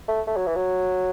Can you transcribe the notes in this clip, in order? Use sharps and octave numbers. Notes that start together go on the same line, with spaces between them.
A3
A3
F#3
E3
F#3